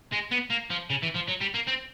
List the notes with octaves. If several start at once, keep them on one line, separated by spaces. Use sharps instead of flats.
G#3
B3
A#3
F3
C#3
E3
F3
F#3
G3
A#3
C4